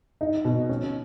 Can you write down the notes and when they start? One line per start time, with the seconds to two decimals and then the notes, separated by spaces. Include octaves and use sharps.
0.21 D#4
0.45 B2
0.69 C#4